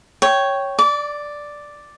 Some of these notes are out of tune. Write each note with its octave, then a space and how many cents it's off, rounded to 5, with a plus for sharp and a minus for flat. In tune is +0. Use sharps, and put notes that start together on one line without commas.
C#5 +0 G5 -10
D5 +0 D6 -30